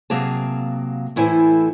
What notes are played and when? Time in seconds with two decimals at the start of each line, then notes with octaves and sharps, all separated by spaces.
0.10 C3 F#3 A#3 G#4 F5 A5
1.16 A2 E3 E4 A4 C5 G#5